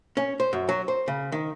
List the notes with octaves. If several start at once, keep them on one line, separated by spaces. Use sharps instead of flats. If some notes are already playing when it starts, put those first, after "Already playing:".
C#4
C5
F#2
F#3
C5
C#3
D#3